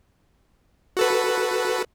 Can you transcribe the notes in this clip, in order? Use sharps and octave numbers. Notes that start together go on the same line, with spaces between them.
F#4 A4 B4